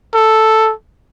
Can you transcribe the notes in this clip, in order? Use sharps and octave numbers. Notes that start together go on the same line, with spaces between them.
A4